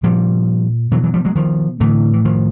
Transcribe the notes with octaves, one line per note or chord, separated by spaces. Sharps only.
A#2 F3 G3
B2 E3 F#3
E3 F#3
F3 G3
F#3 G#3
D#3 F3
A2 D3 E3
E3
D#3 F3